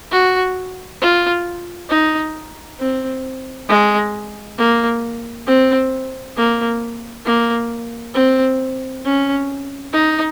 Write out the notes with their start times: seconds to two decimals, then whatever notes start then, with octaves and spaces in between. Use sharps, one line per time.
0.12 F#4
1.01 F4
1.90 D#4
2.80 C4
3.69 G#3
4.58 A#3
5.47 C4
6.37 A#3
7.25 A#3
8.15 C4
9.05 C#4
9.93 D#4